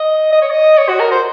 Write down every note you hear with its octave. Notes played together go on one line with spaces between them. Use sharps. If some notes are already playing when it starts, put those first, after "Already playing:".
Already playing: D#5
D#5
C#5
D#5
C#5
F#4
A#4
C5